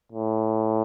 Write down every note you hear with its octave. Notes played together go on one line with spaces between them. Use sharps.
A2